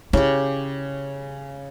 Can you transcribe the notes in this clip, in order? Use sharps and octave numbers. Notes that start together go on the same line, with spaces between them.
C#3 E4 G4